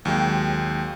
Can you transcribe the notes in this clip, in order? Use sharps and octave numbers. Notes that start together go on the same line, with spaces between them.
D#2 F#3 G#3 G5